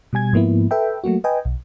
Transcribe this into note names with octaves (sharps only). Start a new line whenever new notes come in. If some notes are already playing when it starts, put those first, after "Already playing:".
B2 G3 G#5 G#6
G#2 F3 A#3 B3 E4
A4 B4 E5 G5
F#3 A3 A#3 F#4
B4 D#5 G5 G#5
B1